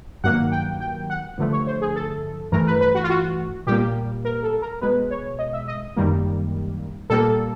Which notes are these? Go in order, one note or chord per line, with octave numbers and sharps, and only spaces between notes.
G2 D#3 F#3 A#3 F#5
G5
G5
F#5
G2 D3 F3 A3
C#5
C5
G#4
A4
G2 E3 A3 A#4
B4
B4
F#4
F4
F#4
A#2 G3 A#3 G4
A#4
A4
A#4
B2 G#3 B4
C#5
D#5
E5
D#5
F#2 D#3 G3 A#3
A#2 G3 A#3 A4